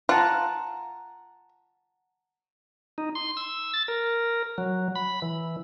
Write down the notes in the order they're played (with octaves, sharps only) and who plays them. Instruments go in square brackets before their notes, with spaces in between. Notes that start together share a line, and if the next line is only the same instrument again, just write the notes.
[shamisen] F4 [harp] F#5 A5 A#5
[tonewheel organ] D#4
C6
E6
A6
A#4
F#3
B5
E3